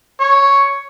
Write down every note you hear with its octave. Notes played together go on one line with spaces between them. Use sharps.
C#5